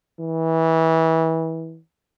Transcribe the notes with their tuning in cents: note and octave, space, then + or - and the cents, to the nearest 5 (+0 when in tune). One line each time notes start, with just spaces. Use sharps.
E3 -25